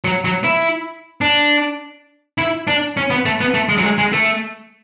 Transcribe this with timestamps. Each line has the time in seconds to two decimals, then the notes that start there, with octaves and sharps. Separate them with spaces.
0.04 F#3
0.24 F#3
0.44 E4
1.21 D4
2.38 E4
2.67 D4
2.97 C#4
3.10 B3
3.25 A3
3.40 B3
3.54 A3
3.69 G#3
3.78 F#3
3.84 G#3
3.98 G#3
4.13 A3